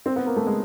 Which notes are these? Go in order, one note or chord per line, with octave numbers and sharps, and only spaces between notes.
C4
B3
A#3
A3
G#3